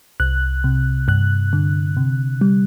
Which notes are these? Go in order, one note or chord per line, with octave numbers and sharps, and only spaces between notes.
C2 F#6
C3
G2 F#6
D3
C3
G3